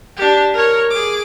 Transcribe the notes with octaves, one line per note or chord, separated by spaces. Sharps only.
D4 G4
A#4 C#5
G#4 D6